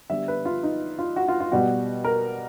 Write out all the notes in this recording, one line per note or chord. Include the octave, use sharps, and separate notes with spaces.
D3 G3 B3 E5
B4
F4
D#4
F4
F#4
F4
F4
B2 G3 B3 F#4
A#4